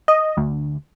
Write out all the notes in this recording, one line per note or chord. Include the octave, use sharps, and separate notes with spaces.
D#5
D2